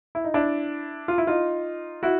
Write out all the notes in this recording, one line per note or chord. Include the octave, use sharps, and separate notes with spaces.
E4
D#4
D4 E4
F4
E4
D#4 F4
E4 F#4